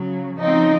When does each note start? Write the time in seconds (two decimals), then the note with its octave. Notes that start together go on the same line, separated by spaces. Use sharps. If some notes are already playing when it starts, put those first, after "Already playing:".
Already playing: C#3 F#3
0.39 C#3 F3 C4 D#4